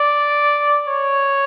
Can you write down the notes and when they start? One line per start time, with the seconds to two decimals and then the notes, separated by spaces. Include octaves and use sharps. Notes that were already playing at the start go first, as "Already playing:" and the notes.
Already playing: D5
0.87 C#5